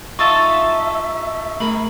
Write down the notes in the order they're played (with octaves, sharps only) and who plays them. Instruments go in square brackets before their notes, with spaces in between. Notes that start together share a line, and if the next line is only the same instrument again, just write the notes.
[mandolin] D#4 A4 A5 [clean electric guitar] F4 [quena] E5 [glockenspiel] C#6
[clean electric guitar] A3 G#4 B5 [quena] A#4